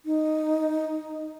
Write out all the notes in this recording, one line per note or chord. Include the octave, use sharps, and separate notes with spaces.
D#4